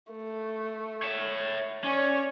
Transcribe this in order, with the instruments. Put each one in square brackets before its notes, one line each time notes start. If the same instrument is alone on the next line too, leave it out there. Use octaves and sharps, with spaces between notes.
[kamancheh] A3
[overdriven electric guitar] C#5 E5
[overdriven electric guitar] C#4 [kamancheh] C#5 D5